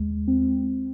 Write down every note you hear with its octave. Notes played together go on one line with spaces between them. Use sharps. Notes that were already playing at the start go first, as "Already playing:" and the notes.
Already playing: D#2 G#3
C4